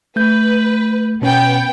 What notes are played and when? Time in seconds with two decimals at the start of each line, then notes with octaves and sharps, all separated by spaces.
0.16 A3 B4 G6
1.22 B2 B3 C#4 G5